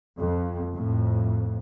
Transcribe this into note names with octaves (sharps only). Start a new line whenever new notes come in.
F2
F2 A2